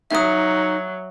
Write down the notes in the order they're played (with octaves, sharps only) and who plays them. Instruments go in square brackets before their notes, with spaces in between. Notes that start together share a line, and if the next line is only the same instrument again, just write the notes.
[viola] F#3 [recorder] D#4 [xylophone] E5 D#6